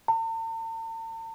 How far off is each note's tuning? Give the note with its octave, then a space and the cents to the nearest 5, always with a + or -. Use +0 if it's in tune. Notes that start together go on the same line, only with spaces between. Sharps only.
A5 +45